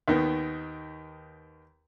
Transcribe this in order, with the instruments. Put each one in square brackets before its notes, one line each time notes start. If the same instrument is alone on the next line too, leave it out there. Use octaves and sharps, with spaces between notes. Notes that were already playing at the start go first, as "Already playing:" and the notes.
[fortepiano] D#2 D#3 B3